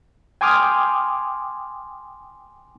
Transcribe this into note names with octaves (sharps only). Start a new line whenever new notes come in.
G5 G#5 C6 D6 D#6 F6